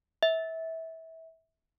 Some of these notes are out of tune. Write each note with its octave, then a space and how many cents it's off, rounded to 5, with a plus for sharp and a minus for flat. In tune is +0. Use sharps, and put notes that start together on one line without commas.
E5 -25